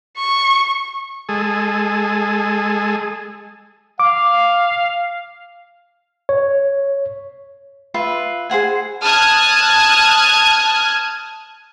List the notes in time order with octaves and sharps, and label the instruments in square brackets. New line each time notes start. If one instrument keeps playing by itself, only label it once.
[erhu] C#6
[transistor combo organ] G#3 G#4 A4
[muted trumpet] F5 [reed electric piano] D6
[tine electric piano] C#5
[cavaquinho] F4 B4 E5
G#4 C5 F#5 G#5
[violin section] A5 D#6 F6 F#6 G#6